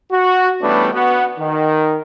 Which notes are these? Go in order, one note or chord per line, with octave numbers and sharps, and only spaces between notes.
F#4
E3 G3 A3 B3 C#4 D4
B3 F#4
D#3